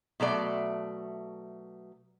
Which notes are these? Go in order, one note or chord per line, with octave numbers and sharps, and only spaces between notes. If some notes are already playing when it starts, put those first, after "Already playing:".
B2 F#3 A3 D5 E5